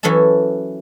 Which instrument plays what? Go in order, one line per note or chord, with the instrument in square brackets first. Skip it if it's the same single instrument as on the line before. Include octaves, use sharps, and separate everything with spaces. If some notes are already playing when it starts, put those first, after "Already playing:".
[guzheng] E3 F#3 C#4 A4 A5